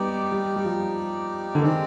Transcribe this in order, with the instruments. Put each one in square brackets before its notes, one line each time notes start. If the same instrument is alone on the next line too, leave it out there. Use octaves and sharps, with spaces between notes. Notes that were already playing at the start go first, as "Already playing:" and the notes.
Already playing: [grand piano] G3 B3 [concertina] D#4 G4 D5
[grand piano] G3
G3
F3
D3
[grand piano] D#3 [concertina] G#3 C4 G4 D5